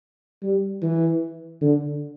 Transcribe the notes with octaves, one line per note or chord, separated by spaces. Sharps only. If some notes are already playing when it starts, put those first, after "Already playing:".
G3
E3
D3